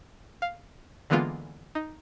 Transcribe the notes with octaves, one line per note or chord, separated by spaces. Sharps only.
F5
D3 E3 G#3 A#3 B3 F4
D#4